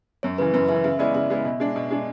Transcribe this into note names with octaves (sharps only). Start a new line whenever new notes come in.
F#2 C#5
C#3 E3 B4
F#2 B4
C#3 E3 E5
C#3 E5
G#3 B3 E4 D5
C#3 E5
G#3 B3 E4
B2
G#3 D4
B2
G#3 D4